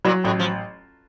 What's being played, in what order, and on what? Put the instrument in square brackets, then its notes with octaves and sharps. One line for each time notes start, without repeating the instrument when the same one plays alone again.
[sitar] A#2 [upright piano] F#3
[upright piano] A1 [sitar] A2
[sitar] F3